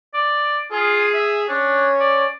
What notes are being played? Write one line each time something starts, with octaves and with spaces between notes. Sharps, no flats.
D5
F4 G#4
E5
C#4 D4 C#5
D5